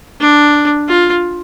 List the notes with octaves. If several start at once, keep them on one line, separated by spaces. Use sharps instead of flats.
D4
F4